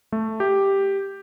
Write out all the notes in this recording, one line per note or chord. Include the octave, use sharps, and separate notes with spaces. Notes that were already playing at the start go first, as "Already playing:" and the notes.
A3
G4